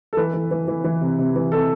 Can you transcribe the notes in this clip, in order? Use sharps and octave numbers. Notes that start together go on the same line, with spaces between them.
A4
E3 B4
E3
E3
E3
E3
C3
C3
E3
C3 A4